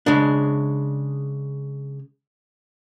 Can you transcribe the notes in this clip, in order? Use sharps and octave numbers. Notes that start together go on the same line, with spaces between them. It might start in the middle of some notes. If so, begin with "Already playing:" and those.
C#3 G#3 D4